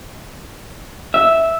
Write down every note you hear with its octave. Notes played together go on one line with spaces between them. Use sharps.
E5